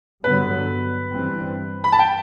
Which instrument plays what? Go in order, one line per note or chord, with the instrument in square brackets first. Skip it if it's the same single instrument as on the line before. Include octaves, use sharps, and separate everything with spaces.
[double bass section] G2 D3 F#3 B3 [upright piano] B4
[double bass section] G2 E3 G3 C4
[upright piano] B5
A5
G5